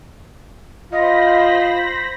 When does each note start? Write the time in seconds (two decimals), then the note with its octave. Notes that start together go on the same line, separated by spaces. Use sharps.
0.92 F4 C5 D#5 B5 A#6